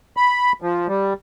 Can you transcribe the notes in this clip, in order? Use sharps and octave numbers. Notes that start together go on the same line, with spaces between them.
B5
F3
G3